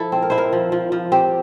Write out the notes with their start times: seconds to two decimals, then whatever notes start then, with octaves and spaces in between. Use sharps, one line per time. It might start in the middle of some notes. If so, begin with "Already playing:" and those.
Already playing: F3 E4 A4
0.12 C4
0.22 A#4
0.30 E4 C5
0.38 A#4
0.53 F3
0.72 F3
0.92 F3
1.12 C4 G4